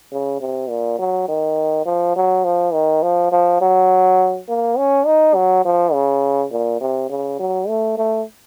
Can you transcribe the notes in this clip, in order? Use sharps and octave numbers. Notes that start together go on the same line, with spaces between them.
C#3
C3
A#2
F#3
D#3
F3
F#3
F3
D#3
F3
F3
F#3
A#3
C#4
D#4
F#3
F3
C#3
A#2
C3
C#3
F#3
A3
A3